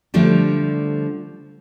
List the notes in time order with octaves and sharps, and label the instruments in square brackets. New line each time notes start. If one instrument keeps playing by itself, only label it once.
[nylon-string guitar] D3 F3 G3 A3 D4